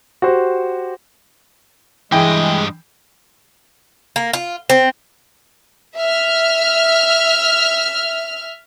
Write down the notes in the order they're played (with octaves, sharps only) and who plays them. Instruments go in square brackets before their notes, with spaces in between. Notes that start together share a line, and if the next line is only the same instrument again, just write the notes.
[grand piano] F#4 G4 C5
[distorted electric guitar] G2 D#5 [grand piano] E3 G5 [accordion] G#3
[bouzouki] A#3
F4
C4
[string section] E5 F6